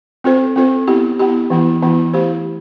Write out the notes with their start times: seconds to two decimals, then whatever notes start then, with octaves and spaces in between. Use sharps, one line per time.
0.24 C4 F4 A4 C5
0.56 C4 F4 A4 C5
0.87 B3 E4 G4
1.19 B3 E4 G4
1.50 E3 B3 E4
1.82 E3 B3 E4
2.13 A3 E4 G4 C5